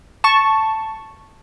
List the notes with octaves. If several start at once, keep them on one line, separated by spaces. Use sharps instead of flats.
A5 C#6